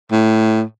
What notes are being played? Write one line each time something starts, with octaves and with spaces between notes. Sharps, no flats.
A2